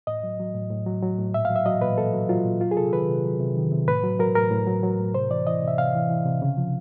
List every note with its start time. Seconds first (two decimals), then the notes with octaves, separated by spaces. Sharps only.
0.07 A2 D#5
0.23 F#3
0.39 F#3
0.55 A2
0.70 A2
0.86 F#3
1.03 F#3
1.18 A2
1.34 A#2 E5
1.45 F#3 F5
1.56 E5
1.66 F#3 D#5
1.81 A#2 B4
1.98 A#2 A4
2.13 F#3
2.29 F#3 F4
2.45 A#2
2.61 F#3 F4
2.71 G#4
2.77 C3 A4
2.93 D#3 B4
3.09 C3
3.25 F#3
3.40 C3
3.57 D#3
3.72 C3
3.88 A2 B4
4.04 F#3
4.19 F#3 A#4
4.36 A2 A#4
4.51 A2
4.67 F#3
4.83 F#3
4.99 A2
5.15 C3 C5
5.31 E3 D5
5.47 E3 D#5
5.62 C3
5.68 E5
5.78 C3 F5
5.94 E3
6.10 E3
6.25 C3
6.42 C#3
6.57 F3